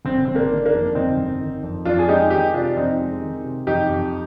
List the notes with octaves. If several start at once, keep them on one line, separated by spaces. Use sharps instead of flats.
G1 C4
G1 C4
A#3 D4
D#3
A#3 D4
F2
G1 C4 D#4
G1
D#3
F2
F2 D4 F4
G#4
G#3 D#4 G4
D#3 D#4 G4
C3 D4 F4
F2 C4 D#4
G#3
D#3
C3
F2 D#4 G4
F2